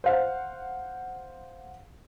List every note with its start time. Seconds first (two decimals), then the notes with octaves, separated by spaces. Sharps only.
0.04 C5 F5 F#5